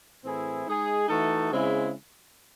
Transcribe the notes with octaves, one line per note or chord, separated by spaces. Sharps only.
A2 E3 C4 E4 G#4
G#3 D#4 G#4
E3 A3 D#4 F#4 A4
C#3 G#3 C4 E4